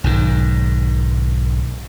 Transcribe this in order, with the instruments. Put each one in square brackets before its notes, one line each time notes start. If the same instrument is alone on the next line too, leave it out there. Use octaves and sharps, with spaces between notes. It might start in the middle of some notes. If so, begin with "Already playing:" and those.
[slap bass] B1 G#2 D#3